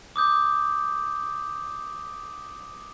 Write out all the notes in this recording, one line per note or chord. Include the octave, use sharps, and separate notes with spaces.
D6 D#6 G6